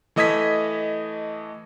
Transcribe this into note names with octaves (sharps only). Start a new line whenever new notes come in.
E3 A3 D#5 D#6 G#6 B6